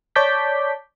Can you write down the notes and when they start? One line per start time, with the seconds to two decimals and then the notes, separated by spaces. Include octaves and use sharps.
0.16 C#5 D5 A5 D6 G6 B6